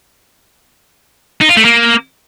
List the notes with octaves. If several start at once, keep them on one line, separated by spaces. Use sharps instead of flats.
D#4
F4
A3
A#3